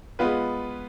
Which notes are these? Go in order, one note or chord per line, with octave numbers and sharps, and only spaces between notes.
G#3 B3 F4 B4